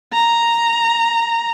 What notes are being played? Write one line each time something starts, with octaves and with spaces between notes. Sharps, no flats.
A#5